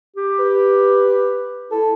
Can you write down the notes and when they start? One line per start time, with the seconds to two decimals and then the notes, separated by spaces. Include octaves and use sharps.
0.16 G4
0.39 B4
1.71 E4 A4